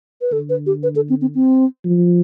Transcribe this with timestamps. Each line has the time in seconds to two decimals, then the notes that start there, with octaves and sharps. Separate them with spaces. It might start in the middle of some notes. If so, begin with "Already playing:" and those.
0.21 B4
0.32 D3 A4
0.50 B4
0.66 G4
0.83 B4
0.96 A4
1.10 C4
1.21 C4
1.35 C4
1.85 F3